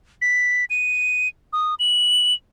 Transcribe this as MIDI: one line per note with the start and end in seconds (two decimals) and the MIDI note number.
0.22 0.65 95
0.70 1.28 99
1.53 1.75 87
1.79 2.33 102